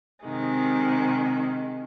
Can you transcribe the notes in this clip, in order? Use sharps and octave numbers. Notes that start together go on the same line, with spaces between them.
C3 D#3 G#3